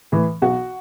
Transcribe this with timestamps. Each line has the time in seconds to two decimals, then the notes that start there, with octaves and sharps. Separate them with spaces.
0.12 A2 E3
0.42 B1 F#4